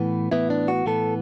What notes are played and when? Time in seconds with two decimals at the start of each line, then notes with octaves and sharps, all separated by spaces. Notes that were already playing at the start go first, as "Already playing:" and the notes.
Already playing: A2 E3 B3
0.32 A2 E3 B3 E4
0.50 D4
0.68 F#4
0.86 A2 E3 B3 A4